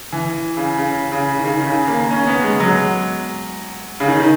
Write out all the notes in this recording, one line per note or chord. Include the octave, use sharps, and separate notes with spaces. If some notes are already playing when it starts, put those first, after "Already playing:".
E3
C#3
C#3
C#3
D#3
C#3
D#3
C#3
A#3
C#4
B3
G#3
F#3
C#3
D#3
D#3